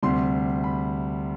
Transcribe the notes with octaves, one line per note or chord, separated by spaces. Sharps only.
D2 C3 G3 C6
B5